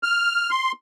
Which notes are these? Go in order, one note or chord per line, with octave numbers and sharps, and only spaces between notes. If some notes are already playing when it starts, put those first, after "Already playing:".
F6
C6